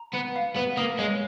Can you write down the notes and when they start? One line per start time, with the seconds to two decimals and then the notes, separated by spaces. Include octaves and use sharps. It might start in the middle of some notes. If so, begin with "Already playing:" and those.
Already playing: A#5
0.14 B3 B4
0.36 F5
0.56 B3 B4
0.77 A#3 D#6
0.99 G#3 C#5